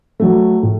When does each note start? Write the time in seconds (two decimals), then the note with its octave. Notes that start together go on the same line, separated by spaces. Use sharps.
0.20 F#3 A3
0.63 A2